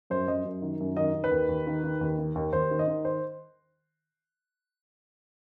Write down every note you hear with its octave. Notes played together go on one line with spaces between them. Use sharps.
F#2 C5
F#2 D#5
F#2
D#3
F#2
D#3 D#5
D#3
B4
D#2
D#2
D#3
D#3
D#2
D#3
D#2
D#2 C5
D#3
D#5
D#3
C5